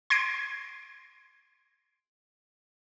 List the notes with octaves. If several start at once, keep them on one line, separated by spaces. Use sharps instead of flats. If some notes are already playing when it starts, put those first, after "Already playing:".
C6 G#6 A#6 C7 D7